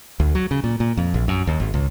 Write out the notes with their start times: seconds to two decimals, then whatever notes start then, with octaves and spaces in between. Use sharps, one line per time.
0.20 D2
0.35 F#3
0.51 C#3
0.64 A#2
0.80 A#2
0.97 F2
1.14 A#1
1.28 F#2
1.47 D#2
1.60 G#1
1.74 C#2